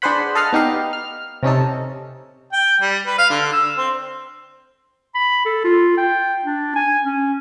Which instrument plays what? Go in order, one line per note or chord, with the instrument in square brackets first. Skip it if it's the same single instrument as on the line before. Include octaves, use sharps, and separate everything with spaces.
[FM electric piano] D4 G#4 B4 C5 F#5 B5
A4 D#5 F5 F#5 F6
B3 D#4 G4 F5
F6
C3 C#4 D#4 A4
[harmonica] G5
G3
B4
F5
D3
E6
C4
[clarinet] B5
A4
F4
G5
D4
G#5
C#4